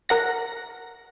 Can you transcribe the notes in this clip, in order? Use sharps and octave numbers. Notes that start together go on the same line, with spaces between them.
A#4 F#5 A#6